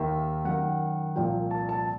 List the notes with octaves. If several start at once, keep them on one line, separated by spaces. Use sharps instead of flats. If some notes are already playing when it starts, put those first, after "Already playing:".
Already playing: D#2 D#3 E5
F#2 D#3 F#5
C2 A#2 F3 G5
A5
A5